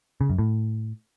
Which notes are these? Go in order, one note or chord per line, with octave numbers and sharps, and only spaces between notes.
C#3
F#2
A2